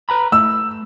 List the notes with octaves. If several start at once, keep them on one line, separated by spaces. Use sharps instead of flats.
B4 A#5 B5
A3 E6